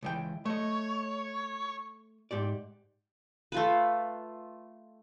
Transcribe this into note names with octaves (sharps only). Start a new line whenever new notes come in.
C#2 E3 G5
A3 C#5 D#5
G#2 G4 D5
A3 F4 B4